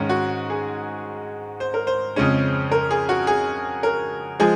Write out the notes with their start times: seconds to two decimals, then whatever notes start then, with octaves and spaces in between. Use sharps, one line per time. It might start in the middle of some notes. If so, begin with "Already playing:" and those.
Already playing: G#2 D#3 G#3 C#4
0.09 F#4
0.50 G#4
1.60 C5
1.74 A#4
1.87 C5
2.16 F2 C#3 G#3 C#4
2.72 A#4
2.91 G#4
3.09 F#4
3.27 G#4
3.83 A#4
4.40 F3 G#3 G#4